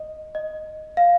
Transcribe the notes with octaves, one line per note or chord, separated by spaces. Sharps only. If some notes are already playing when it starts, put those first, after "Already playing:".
Already playing: D#5
D#5
F5